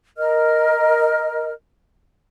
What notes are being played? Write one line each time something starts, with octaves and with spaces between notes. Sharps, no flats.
A#4 D#5 F6